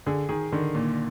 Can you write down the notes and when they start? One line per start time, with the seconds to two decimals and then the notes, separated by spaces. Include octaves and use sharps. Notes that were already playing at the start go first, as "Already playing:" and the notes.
0.06 D3 G#4
0.29 D#3 G#4
0.52 D3 D#3
0.75 A#2